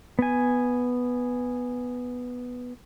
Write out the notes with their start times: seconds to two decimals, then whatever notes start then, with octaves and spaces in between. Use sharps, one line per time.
0.19 B3 G#5